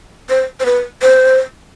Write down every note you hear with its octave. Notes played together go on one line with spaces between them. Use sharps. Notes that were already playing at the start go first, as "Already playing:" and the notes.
C5
C5
B4
C5